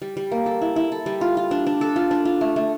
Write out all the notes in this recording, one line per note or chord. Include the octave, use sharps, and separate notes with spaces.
G3
G3
A#3
A4
E4
E4
A4
G3
F4
F4
D4
D4
A4
F4
D4
F4
A3
A3